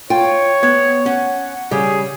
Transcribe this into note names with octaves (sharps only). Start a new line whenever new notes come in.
F4 C#5 G5
B3 G#6
C#4 F#5
C#3 G3 G#4